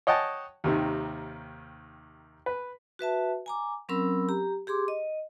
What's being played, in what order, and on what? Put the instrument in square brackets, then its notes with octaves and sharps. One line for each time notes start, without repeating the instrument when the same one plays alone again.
[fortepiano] C#5 D#5 F#5 G5 A5
D#2 C3 D#3
B4
[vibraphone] F#4 B4 E5 A5
G#5 A#5 D6
F#3 C4 C#4 A#4 B5 E6
G4 A#5
G4 G#4 C6 D6
D#5